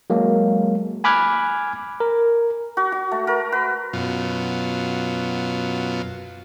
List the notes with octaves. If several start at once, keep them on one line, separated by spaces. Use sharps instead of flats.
F#3 G#3 A#3
G#5 B5 D6 F6 F#6 G#6
A#4
F#4
F#4
A3
A#4
B4
F#2 B2 F4